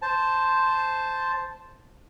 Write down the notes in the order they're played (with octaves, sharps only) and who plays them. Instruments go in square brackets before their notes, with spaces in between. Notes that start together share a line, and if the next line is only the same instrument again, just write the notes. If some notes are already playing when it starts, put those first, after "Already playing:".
[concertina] C5 A5